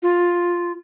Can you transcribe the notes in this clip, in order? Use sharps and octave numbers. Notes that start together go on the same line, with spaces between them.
F4